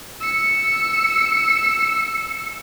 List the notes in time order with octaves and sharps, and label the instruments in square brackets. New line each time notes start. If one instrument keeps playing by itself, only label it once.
[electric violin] E6 C#7